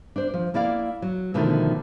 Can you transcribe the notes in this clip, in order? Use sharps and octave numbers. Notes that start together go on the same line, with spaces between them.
D4 C5
F3
A#3 E4 D5 F5
F#3
B2 D3 D#3 F3 A3 B3